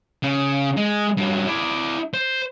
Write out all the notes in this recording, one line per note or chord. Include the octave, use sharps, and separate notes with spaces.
C#3
G#3
G2 F#3
E4 D5
C5